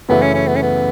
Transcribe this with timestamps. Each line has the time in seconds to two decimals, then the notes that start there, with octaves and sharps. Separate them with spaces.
0.09 F#2 C#3 E3 A3 B3 E4
0.22 C#4
0.34 C#4
0.47 B3
0.56 C#4
0.62 B3